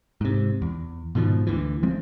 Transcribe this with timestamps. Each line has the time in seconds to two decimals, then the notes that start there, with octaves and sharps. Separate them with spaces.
0.21 G#2 C3
0.62 E2
1.15 G#2 B2 D#3 F3
1.47 D2 E3
1.83 F3 G#3 A3 C4